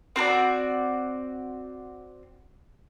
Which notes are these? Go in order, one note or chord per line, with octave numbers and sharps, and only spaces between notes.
C4 F#4 A#4 D5